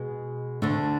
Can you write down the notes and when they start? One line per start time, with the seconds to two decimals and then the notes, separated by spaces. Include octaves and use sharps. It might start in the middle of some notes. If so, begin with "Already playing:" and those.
Already playing: B2 G#3 B3
0.62 D2 D3 A3 D4